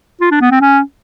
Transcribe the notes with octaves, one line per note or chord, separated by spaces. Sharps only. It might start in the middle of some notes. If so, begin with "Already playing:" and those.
F4
D4
B3
C4
C#4